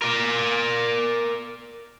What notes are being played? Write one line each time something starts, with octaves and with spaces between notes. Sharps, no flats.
A#4 D5